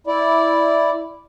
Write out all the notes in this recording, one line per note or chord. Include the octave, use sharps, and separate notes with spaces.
E4 D5